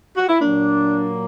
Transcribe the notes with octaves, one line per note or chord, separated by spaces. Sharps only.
F#4
E4
A#2 F#3 A#3 D4